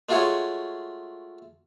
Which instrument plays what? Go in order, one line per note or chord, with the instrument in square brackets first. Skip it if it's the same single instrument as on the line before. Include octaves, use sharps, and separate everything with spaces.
[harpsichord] G#3 A3 F4 F#4 G#4 C#5